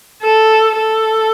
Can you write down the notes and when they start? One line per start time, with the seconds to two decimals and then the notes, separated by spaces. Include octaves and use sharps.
0.23 A4
0.78 A4